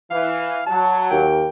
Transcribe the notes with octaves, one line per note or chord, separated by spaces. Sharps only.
E3 F5
F#3 A5
D#2 G5